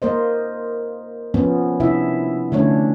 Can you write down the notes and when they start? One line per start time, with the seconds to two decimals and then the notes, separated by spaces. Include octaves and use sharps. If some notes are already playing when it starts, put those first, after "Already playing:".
0.02 A#3 A#4 C5 D#5
1.34 F3 B3 C#4
1.80 C3 D4 E4 E5
2.52 D3 A3 C#4 D4 C#5